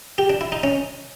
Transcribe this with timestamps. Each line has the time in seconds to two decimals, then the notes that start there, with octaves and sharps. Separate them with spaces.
0.18 G4
0.30 D4
0.41 E4
0.52 D#4
0.63 C#4